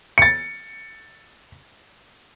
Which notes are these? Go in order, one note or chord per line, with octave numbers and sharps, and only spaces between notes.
A6 C#7